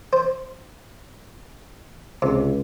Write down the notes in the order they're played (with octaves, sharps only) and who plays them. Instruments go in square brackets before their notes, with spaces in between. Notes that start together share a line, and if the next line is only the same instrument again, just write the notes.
[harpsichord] C5
[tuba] C#2 [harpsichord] C3